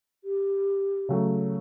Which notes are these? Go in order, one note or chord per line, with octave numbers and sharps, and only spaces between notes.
G4
C#3 F#3 A3